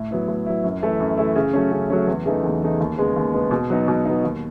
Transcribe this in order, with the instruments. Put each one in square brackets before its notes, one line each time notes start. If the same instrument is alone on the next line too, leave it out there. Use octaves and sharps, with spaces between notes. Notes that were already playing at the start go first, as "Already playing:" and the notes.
Already playing: [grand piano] A2
F#3 B3 E4
A2
F#3 B3 E4
F#2
E3 A3 E4
F#2
E3 A3 E4
C#3
F#3 A3 C#4
C#3
F#3 A3 C#4
E2
C#3 E3 A3 D#4
E2
C#3 E3 A3 D#4
D#2
C#3 G#3 B3
D#2
C#3 G#3 B3
B2
F#3 B3 D#4
B2
F#3 B3 D#4
D#2